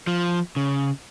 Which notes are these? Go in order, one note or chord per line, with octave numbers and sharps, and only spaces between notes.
F3
C#3